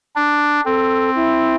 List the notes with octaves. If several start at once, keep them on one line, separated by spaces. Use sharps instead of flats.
D4
C4 A4
E4